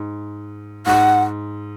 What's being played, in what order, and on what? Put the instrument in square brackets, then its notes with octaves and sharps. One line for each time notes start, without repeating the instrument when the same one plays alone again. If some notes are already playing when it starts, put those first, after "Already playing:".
Already playing: [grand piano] G#2
[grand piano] G#2 [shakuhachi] F#5